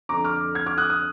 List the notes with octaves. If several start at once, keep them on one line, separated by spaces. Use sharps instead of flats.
F2 D3 A#5 D6
D6 F6
F6 G#6
D6 F6
D#6 F#6
D#6 F#6